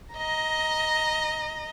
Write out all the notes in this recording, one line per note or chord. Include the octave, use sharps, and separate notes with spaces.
D#5 A#5